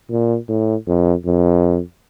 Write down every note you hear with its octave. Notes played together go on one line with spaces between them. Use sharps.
A#2
A2
F2
F2